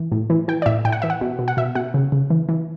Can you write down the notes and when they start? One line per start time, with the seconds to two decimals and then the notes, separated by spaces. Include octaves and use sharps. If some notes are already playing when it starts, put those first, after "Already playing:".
Already playing: E3
0.12 A2
0.30 E3
0.48 E3 G5
0.62 D5
0.66 A2 E5
0.85 A2 G5
0.92 F#5
1.02 E3 E5
1.10 F#5
1.21 B2
1.39 B2
1.48 F#5
1.57 B2 E5
1.75 B2 F#5
1.94 C#3
2.12 C#3
2.30 E3
2.49 E3